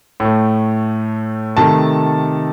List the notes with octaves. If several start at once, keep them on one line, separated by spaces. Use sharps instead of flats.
A2 A3
C3 D#3 A3 A5